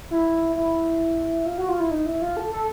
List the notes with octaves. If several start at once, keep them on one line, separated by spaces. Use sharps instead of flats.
E4
E4
F4
F#4
F4
E4
D#4
E4
F4
A4
A4